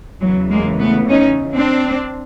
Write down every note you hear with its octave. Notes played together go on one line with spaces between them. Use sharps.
E2 C#3 E3 F#3 G#3
G#3 A#3
A3 B3
C#4 D#4
C4 D4